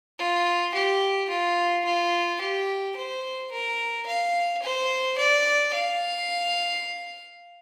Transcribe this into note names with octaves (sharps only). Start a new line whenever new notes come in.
F4
G4
F4
F4
G4
C5
A#4
F5
C5
D5
F5